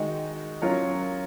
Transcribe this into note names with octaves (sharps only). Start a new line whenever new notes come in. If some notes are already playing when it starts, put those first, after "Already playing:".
Already playing: D#3 G#3 D#4 F#4
F#3 C#4 F4 A#4 C#5